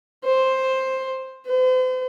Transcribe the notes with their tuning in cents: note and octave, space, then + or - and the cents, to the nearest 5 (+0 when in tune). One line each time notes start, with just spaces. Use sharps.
C5 +10
C5 -40